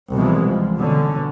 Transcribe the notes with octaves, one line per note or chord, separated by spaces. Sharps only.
C2 B2 E3 F3 G#3
F3
B2 D3 C#4